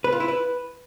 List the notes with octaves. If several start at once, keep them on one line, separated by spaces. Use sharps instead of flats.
B4
F4
E4
B4